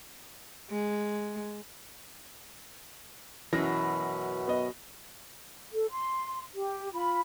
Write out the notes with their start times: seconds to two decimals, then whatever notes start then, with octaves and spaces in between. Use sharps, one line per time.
0.70 G#3
3.53 F#2 B2 E3 A#6
4.48 B3 D#5
5.73 A4
5.90 C6
6.55 G4
6.94 F4 B5